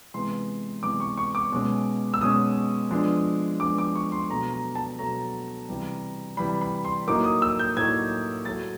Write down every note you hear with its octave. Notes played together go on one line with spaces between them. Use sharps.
C3 E3 G#3 B3 C6
C3 E3 G#3 B3 D6
C#6
C#6
D6
B2 G#3 C#4
E6
B2 G#3 C#4 D#6
F3 G#3 B3 D4
F3 G#3 B3 D4 D6
D6
C#6
C6
B2 F#3 A3 A#5
A#5
A5
B2 F#3 A3 A#5
C3 E3 G3
C3 E3 G3 B5
B5
C6
A2 F#3 A#3 D#4 D6
D#6
E6
G6
A2 F#3 A#3 D#4 G#6
A2 F#3 A3 A6